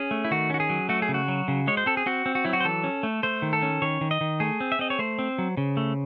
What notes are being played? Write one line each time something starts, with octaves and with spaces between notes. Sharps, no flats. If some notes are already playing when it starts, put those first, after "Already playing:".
Already playing: C#4 G#4
A3
E4
D#3 F#4
C#4 F#4
G#4
F#3
A3 F#4
G#4
C#3
F#4
F#3
C#3
G#3 C#5
C5
C4 A4
G#4
C4 F#4
C4
F#4
F#3 E4
F#4
C5
E3 A4
C#4
A3
A3 C5
D#3
A4
C#4
D#3 C#5
D#3
D#5
D#3
A3 G#4
C4
E5
C4 D#5
C#5
A3 C5
C4
F#3
C#3
A3